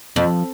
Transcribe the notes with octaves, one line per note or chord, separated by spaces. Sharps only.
F2 F3